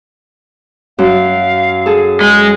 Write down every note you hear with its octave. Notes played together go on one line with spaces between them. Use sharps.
F#2 F5
G#4 A4
G#3